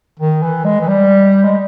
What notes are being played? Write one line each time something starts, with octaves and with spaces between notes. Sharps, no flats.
D#3
E3
G#3
E3
G3
G#3